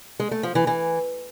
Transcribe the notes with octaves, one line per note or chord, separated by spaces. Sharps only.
G#3
A3
F3
E3
E3